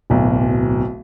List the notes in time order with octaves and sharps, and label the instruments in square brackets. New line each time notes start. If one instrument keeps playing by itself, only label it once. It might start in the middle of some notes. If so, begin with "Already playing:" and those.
[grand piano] D1 B1